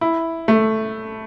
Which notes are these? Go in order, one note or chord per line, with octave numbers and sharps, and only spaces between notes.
E4
A3